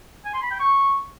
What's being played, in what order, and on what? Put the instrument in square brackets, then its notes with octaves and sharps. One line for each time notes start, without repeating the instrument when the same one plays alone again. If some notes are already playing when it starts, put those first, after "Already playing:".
[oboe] G#5
C6
B5
G5
C#6